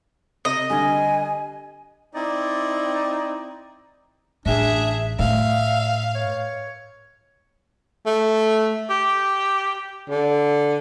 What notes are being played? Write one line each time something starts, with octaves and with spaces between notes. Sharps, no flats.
C3 D#5
D3 G3 G#5
C4 D#4 E4 D5
A1 D4 G#4 E5
A2 E5 F5
C#5
A3
G4
D3